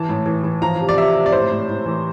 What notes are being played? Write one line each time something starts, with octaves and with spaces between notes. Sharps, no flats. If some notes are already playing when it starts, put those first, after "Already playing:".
Already playing: E3 A5
A2
E3
E3
F3 A#5
C3
D5
C3 E5
C3
D5
A2 C5
A2
A2
E3